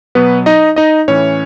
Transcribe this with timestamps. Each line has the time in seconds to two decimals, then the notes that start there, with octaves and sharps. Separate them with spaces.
0.15 B2 F#3 B3 B4
0.46 D#4 D#5
0.76 D#4 D#5
1.08 A2 E3 C#4 C#5